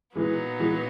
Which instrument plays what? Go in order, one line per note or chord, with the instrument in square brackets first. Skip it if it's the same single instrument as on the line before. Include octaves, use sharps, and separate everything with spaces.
[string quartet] A#2 F#3 B3 D#4 [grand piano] E3 G#3
[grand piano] E3 G#3